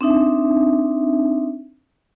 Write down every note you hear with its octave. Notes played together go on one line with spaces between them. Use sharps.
C4 D4 D#4 E5